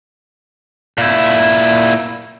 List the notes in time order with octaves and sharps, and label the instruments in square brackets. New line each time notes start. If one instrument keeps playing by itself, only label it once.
[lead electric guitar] A#2 E4